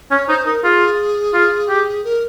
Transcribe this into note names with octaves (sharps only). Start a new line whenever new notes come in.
C#4 C#5
D#4 C5
D#4 A#4
F4 G#4
F4
G4
A#4